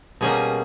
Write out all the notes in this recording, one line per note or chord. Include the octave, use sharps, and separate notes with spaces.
B2 G3 A#3 C#4 G#4